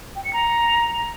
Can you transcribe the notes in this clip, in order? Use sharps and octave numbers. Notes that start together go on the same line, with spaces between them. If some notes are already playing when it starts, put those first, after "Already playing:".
G5
C#7
A#5